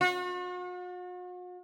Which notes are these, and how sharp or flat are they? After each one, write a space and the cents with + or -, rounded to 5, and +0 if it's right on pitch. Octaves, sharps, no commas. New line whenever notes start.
F#4 -45